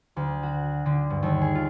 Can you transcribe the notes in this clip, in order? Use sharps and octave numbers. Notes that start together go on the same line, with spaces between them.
D2
F#4
D3
G2
D#2
G#4
F4